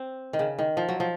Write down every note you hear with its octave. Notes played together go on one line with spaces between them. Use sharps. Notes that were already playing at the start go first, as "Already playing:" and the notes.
Already playing: C4
D#3
C#3
D#3
F3
F#3
F3